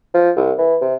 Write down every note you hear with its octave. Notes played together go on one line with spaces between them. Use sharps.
F3
C2
E3
C3